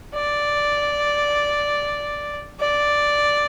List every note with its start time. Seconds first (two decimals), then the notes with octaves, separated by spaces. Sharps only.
0.15 D5
2.60 D5